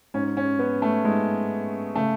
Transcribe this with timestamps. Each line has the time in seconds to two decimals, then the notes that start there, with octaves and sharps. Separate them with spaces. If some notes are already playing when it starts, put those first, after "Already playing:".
0.14 G#2 C#4
0.37 C#4
0.59 B3
0.82 A3
1.04 G#2 G#3
1.95 C#3 A3